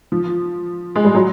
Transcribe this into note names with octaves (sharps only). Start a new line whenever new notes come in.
F3
G#3
G3
F#3